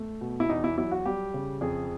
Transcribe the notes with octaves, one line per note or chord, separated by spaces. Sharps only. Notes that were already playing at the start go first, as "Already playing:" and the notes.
Already playing: A3
B2
E4
E2 D#4
E4
F#3 E4
F#4
G3 G4
C#3
F2 G#4